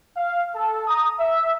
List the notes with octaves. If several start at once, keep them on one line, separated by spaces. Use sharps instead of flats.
F5
A4
A#5 D#6
E5